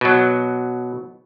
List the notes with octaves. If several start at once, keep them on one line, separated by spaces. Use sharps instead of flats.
B2 F#3